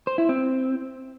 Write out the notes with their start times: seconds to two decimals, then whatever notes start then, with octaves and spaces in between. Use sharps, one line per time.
0.07 C5
0.18 E4
0.29 C4